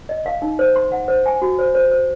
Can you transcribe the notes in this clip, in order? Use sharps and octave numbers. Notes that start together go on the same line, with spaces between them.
D#5
F5
D#4
C5
C6
F#5
C5
G#5
F#4
C5
C5
C5